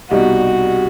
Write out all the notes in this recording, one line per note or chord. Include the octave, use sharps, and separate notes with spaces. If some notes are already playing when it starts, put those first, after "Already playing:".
C2 B2 G3 D#4 F#4